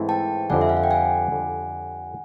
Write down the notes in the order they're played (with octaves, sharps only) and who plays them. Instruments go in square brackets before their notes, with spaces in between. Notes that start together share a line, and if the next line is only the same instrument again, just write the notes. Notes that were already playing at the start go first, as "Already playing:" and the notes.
Already playing: [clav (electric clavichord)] G#2 E3 A3 C4 E4
[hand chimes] G5 A5
[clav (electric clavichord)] F2 D3 G3 [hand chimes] F#5 G#5
[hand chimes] E5
F5
F#5
G5
F#5 G#5
[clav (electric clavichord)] F2 D3 G3